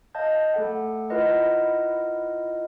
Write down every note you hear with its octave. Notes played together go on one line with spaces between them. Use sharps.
D#5 F5 A5 G6
A3 A4 F#5
E4 F4 A#4 B4 D#5 F#5